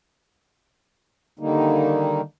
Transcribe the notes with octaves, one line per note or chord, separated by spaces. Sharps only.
D3 D#3 G3 A#3 D#4